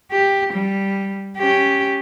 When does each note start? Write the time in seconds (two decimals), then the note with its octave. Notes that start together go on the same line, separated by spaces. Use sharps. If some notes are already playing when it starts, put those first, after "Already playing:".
0.12 G4
0.53 G3
1.38 C#4 G4